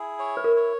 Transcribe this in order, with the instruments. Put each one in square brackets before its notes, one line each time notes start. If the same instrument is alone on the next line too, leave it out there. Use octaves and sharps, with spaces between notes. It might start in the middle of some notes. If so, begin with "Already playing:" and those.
Already playing: [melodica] E4 G#4
C#5
[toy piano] B4
A#4
[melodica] C#5